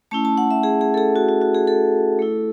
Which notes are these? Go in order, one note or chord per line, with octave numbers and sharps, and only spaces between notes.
A3 C#4 E4 A5
A5
F#5
E5
G#4
G#4
A4
G#4
F#4
F#4
F#4
G#4
A4
A3 E4